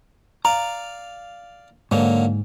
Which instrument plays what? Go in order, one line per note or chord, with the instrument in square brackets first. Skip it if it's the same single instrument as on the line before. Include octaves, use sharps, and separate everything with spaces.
[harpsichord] D5 F5 [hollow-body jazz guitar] A#5
[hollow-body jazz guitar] G#2 [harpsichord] D3 F#3 A#3